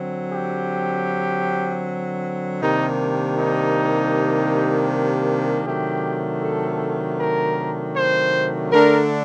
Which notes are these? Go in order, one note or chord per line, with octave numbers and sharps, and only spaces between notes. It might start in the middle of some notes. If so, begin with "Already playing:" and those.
Already playing: D3 F#3 C4
G4
C3 D#3 G3 A#3 D4 D#4
D#4
C3 D#3 F#3 A3 D4 G4
A4
A#4
C5
D3 A3 D4 A#4